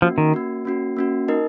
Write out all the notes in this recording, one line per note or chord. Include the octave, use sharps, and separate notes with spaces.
F3 A#3 C#4 F#4
D#3
A#3 C#4 F#4
A#3 C#4 F#4
A#3 C#4 F#4
D#4 A#4 D#5